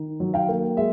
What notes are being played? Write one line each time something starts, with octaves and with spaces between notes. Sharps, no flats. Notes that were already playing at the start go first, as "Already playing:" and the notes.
Already playing: D#3
F#3
F5 G5
A#3
G#3 E5